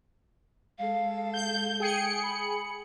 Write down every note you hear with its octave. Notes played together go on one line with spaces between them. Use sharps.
G#3 A4 F5
G6
G#4 G5 C#7
B5